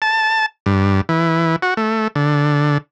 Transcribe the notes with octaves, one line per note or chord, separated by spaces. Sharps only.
A5
G2
E3
F#4
A3
D3